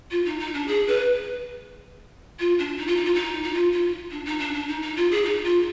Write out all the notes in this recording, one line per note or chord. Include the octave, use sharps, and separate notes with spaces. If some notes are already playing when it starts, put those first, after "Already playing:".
F4
D#4
D#4
D4
G#4
B4
F4
D4
D#4
F4
D#4
F4
D#4
D#4
F4
F4
D4
D#4
D4
D4
D#4
D#4
F4
G#4
D#4
F4